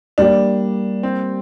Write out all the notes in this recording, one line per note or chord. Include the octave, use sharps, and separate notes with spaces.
G3 A#3 D4 G4 D5
C4